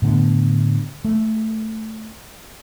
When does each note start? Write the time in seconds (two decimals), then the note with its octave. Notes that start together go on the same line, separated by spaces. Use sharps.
0.02 A2 D3 B3
1.05 A3